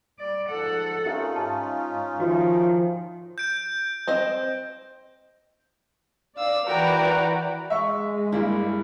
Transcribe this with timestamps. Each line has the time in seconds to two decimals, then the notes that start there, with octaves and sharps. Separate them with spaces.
0.19 G3 D5
0.48 G#2 F3 A4 F#5
1.06 C#4 D#4 F4 G4 A#4 E5
1.36 G#2 A5
2.20 D#3 F3 F#4 E5
3.38 G6 D7
4.08 C4 C5 D#5
6.37 D5 F5 E6
6.66 E3 F#4 A#4 B4 D5 G5 A#5
7.70 G#3 E5 C#6
8.32 G2 A#3 E4